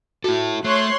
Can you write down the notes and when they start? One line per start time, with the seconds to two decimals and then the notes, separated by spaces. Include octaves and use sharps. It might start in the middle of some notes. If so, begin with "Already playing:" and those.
0.24 E4 F#4 A4
0.64 A3 C#5 C6 F#6